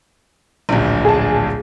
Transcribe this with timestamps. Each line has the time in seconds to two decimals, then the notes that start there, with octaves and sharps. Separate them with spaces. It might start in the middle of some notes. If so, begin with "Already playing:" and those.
0.69 D1 A#1
1.05 G#4 A5